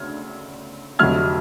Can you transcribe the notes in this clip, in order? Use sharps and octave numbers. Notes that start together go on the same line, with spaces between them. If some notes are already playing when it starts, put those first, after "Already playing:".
Already playing: D2 C#3 F6 G#6
F1 F2 D3 F#3 A3 F6 G#6